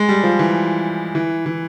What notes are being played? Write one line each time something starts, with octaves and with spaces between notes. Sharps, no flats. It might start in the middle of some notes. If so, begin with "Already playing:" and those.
Already playing: G#3
G3
F3
E3
E3
E3